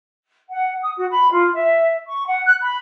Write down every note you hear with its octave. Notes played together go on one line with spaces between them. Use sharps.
F#5
D#6
F#4
B5
F4
E5
C#6
F#5
F#6
B5